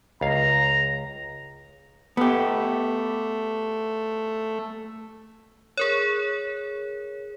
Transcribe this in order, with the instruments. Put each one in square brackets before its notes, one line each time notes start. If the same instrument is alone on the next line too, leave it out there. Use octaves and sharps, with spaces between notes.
[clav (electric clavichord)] C#2 F5 [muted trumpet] A#5
[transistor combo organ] A3 [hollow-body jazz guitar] B3 G4
[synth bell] G#4 A#4 C#5